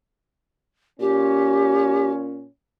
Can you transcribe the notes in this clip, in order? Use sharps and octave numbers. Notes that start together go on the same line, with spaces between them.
A#2 C#4 G4